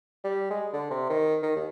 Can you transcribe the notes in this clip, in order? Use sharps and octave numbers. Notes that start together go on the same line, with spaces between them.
G3
G#3
D3
C3
D#3
D#3
D#2